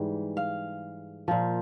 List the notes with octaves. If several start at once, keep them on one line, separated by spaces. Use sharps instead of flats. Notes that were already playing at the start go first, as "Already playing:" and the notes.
Already playing: G#2 E3 G3
F5
A#2 F3